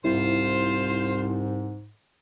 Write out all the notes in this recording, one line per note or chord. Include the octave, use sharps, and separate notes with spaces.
C2 G#2 E4 F4 C5